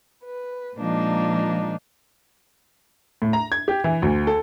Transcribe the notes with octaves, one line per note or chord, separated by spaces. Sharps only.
B4
A#2 F3 G#3 A#3 D4 D#4
A2
A#5
G#6
G4
E3
D2
A4